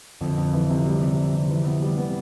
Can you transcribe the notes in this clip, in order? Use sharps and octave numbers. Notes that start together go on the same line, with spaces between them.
F2 D3 F3
F2
E3
C3
G3
C3
G3
C3
E3
B3
G3
B3